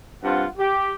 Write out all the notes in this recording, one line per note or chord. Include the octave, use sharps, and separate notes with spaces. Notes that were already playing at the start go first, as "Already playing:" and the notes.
G2 C4 F4 F#5
G4